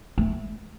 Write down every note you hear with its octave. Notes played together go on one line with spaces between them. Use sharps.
A3